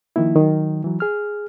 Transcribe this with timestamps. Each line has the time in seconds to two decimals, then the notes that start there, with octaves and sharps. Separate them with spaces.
0.16 D#3 F3 A#3 E4
0.35 D#3 F#3
0.84 E3 F#3
1.00 G#4 F6